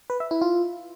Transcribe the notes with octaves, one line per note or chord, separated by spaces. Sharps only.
B4
E5
E4
F4